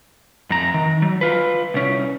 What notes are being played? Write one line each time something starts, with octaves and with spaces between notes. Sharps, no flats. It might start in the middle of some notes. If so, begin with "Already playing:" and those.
F2 A#5
D#3
F#3
F4 B4
C2 C#4